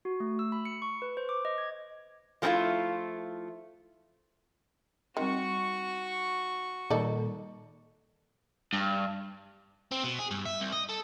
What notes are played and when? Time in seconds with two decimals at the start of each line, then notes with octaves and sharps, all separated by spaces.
0.05 F#4
0.20 A3
0.39 E6
0.52 B5
0.65 C#7
0.82 C#6
1.02 B4
1.17 C5
1.29 D6
1.45 D#5
1.58 G#6
2.42 F3 G#3 A3 C4 E4 F4
5.17 D#3 G3 C4 F#4 C6 C#6
6.90 A#2 D#3 G3 D#4 A4 D5
8.73 G2
9.91 C4
10.04 B2
10.19 G#4
10.31 G2
10.45 E5
10.60 C2
10.72 D#5
10.89 A4